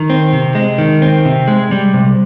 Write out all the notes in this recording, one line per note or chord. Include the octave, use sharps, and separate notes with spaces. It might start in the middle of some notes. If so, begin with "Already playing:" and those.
Already playing: D#3
C4
C3
G#3
D#3
C4
C3
G#3
G3
C3